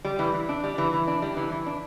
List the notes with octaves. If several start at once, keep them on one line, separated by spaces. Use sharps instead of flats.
G3
E3
E3
D4
G3
E3
E3
D4
G3
E3
E3
D4